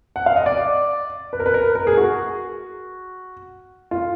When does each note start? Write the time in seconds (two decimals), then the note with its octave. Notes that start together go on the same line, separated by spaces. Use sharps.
0.16 F#5
0.26 F5
0.36 D#5
0.46 D5
1.33 B4
1.40 A#4
1.46 B4
1.54 A#4
1.75 A#4
1.87 G#4
1.97 F#4
3.91 F4